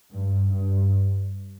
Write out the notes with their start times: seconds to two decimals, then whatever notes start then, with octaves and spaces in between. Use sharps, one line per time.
0.12 G2
0.52 G2